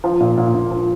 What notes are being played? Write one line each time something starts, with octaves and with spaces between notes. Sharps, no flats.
F3
A#2
A#2
A#2
F3